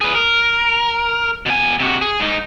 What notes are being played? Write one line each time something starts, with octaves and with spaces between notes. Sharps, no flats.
G#4 B4
A#4
B2 G#5
C3 F#4
G#4
G#2 D#4